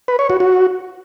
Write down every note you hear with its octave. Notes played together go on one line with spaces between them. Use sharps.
B4
C#5
F#4
F#4